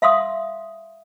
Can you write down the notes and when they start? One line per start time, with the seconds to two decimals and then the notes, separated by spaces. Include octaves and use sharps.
0.02 E5 F5 C6 D#6